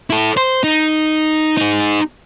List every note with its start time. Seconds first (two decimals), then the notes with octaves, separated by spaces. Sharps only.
0.10 E4 A4
0.37 C5
0.64 D#4
1.57 D#4 G#4